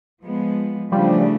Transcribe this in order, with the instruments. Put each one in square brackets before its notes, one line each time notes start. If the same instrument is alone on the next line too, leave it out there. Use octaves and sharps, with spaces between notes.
[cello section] F3 G#3 B3
[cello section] C#3 E3 A3 D4 [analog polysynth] F3 G3